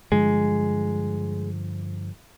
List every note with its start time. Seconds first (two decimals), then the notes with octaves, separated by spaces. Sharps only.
0.12 G2 D3 F3 G#3